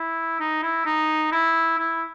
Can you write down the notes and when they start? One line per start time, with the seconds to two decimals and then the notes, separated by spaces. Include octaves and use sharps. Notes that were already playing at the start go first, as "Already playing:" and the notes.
Already playing: E4
0.40 D#4
0.63 E4
0.85 D#4
1.32 E4
1.78 E4